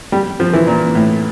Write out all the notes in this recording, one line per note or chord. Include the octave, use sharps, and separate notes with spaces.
G3
F3
E3
A#2
A2